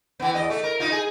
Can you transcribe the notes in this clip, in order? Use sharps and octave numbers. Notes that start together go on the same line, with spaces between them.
E3 B3
E2 D#5
A3
A#4
D#4 F4
G#4